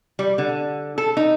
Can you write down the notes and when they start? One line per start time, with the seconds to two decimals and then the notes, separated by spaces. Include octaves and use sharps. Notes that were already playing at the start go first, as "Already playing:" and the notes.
0.19 G3
0.38 D3
0.98 A4
1.17 D#4